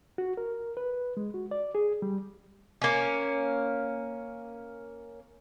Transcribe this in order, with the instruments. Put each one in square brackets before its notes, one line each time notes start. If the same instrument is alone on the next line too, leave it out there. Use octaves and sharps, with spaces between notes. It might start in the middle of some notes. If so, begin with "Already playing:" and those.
[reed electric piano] F#4
A#4
B4
G#3
F#4
D5
G#4
G3
[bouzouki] A#3 C#4